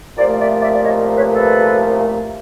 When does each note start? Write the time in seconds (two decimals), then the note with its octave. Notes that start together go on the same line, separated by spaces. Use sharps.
0.17 C2 A#2 F3 A3 C5 D5
0.40 D5 E5
0.61 D5 E5
0.74 D5
0.84 C#5 D#5
1.17 B4 C#5
1.33 A4 B4